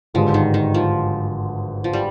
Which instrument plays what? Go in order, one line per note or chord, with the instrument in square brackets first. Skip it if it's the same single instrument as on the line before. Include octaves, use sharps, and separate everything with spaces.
[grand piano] G#1 G2 D3 G#3 [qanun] F3
[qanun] D#3
D#3
F3
F3
G3